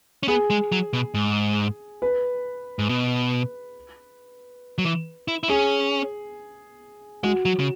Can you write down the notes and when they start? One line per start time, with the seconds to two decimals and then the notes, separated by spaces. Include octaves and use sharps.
0.23 C#4
0.28 B3 G#4
0.50 G#3
0.72 F#3
0.93 B2
1.14 G#2
2.02 B4
2.79 G#2
2.89 B2
4.78 F#3
4.85 E3
5.28 E4
5.43 E4
5.49 C#4 G#4
7.23 G#3 F#4
7.45 F#3
7.59 C#3